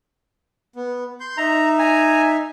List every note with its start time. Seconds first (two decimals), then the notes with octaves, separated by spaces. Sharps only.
0.76 B3
1.20 C6 G6
1.38 D#4 E5 A#5
1.79 G#5 A#5